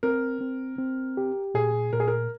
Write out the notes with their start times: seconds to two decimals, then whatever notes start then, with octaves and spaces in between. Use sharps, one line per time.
0.03 C4 A#4
0.41 C4
0.78 C4
1.17 G4
1.54 A#2 G#4
1.93 A#2 A#4
2.00 G#4
2.08 A#4